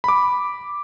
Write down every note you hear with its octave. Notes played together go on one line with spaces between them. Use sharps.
B5 D6